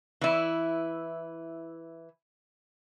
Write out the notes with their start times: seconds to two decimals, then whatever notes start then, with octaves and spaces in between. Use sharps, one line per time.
0.21 E3 E4